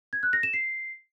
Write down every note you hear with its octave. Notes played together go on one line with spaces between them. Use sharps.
G#6
F#6
A#6
E7
C7